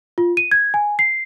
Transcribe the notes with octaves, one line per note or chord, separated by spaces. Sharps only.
F4
D#7
G#6
G#5
C7